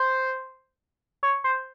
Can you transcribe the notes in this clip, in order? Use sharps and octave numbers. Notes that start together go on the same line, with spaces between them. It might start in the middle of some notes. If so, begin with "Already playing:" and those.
Already playing: C5
C#5
C5